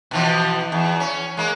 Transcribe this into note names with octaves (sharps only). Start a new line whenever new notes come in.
B2 E3 F3
E2
C#4
G#3 A#3